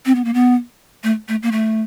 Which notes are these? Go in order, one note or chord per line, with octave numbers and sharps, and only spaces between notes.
C4
B3
A#3
B3
A3
A3
A#3
A3